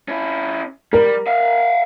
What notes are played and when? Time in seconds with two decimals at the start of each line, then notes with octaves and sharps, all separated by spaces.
0.08 C#4 E4
0.93 G3 A#4
1.27 E5 F5